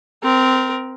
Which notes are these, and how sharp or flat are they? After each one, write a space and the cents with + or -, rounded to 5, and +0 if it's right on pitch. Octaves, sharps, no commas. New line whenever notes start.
C4 -15 A#4 +10